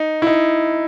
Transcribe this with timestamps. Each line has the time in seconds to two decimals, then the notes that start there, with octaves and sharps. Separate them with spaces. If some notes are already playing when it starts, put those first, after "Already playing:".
Already playing: D#4
0.22 E4
0.27 D#4